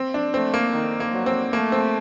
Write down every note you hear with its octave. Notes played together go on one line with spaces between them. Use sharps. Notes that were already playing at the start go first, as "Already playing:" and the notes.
Already playing: C4
D4
A3 C4
A#3
D#3
A#3
F#3
C4
A3 A#3
C4